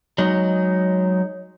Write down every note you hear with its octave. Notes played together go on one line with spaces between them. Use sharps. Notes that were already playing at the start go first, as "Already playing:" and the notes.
F#3 G#3 D#4